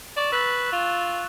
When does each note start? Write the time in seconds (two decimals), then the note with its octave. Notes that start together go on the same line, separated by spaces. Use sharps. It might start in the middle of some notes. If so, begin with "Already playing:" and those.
0.17 D5 C#6 E7
0.32 B4 E6 F#6 A6
0.72 F4 C#6